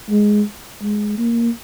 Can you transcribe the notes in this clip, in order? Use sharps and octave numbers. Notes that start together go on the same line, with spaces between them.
G#3
G#3
A#3